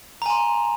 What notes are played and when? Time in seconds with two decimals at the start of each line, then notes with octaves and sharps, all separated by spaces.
0.22 A#5
0.26 G#5
0.30 C6